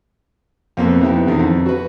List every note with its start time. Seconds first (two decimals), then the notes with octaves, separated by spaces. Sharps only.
0.77 F2 A#3 B3
1.00 F2 B3 D#4 E4 G4
1.27 E2 D3 D#3
1.39 F2
1.66 F#4 B4